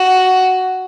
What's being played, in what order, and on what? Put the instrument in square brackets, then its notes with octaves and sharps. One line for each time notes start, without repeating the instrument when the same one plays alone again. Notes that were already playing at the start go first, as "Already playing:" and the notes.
Already playing: [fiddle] F#4